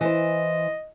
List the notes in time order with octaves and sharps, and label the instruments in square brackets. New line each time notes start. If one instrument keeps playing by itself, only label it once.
[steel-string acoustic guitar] E3 C5 [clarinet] D#5